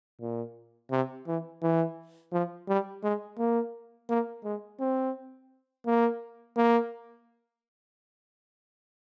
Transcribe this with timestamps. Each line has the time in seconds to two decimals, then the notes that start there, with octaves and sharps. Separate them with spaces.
0.21 A#2
0.91 C3
1.27 E3
1.62 E3
2.32 F3
2.68 G3
3.03 G#3
3.38 A#3
4.09 A#3
4.44 G#3
4.80 C4
5.86 A#3
6.57 A#3